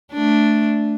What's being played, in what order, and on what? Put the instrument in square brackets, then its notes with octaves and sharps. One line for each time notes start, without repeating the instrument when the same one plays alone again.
[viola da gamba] A3 D4